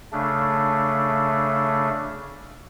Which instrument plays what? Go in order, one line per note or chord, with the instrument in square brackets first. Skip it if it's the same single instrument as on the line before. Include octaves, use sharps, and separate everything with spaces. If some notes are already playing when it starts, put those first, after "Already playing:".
[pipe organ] C#3 A3 D4